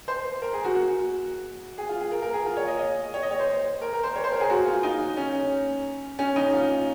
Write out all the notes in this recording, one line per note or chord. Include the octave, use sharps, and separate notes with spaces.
C5
A#4
G#4
F#4
F#4
G#4
F4
G#4
A#4
A#4
G#4
F4
C#5
D#5
D#5
C#5
D#5
C#5
C5
A#4
A#4
C5
C#5
C5
A#4
G#4
F#4
F4
D#4
C#4
C#4
D#4
F4